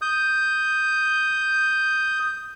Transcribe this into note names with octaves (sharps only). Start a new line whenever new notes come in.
D#6 G6